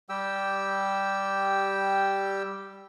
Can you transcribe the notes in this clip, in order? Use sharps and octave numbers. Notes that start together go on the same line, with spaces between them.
G3 G4 G5 E6